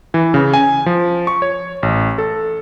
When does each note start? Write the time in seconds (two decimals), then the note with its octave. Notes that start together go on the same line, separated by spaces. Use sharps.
0.14 E3
0.34 C#3
0.54 G#5
0.86 F3
1.27 C#6
1.42 C#5
1.83 A1
2.18 A4